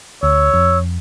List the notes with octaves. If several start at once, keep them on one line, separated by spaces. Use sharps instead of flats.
D2 C#5 E6
F2